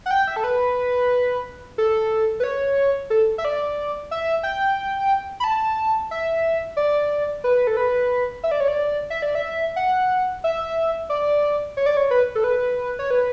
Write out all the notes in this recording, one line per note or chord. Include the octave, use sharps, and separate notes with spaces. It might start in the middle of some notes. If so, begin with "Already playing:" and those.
F#5
G5
E5
A4
B4
A4
B4
C#5
A4
E5
D5
E5
G5
B5
A5
E5
D5
B4
A4
B4
E5
D5
C#5
D5
E5
D5
E5
F#5
E5
D5
C#5
D5
C#5
B4
A4
B4
C#5
B4